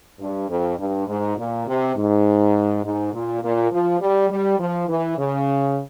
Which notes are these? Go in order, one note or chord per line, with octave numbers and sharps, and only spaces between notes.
G2
F2
G2
G#2
A#2
C3
G#2
G#2
A#2
A#2
F3
G3
G3
F3
E3
C#3